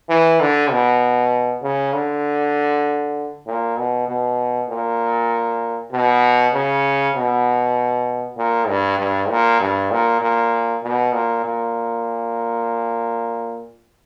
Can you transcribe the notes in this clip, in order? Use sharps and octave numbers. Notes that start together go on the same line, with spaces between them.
E3
D3
B2
C#3
D3
A#2
B2
B2
A#2
B2
C#3
B2
A#2
G2
G2
A#2
G2
A#2
A#2
B2
A#2
A#2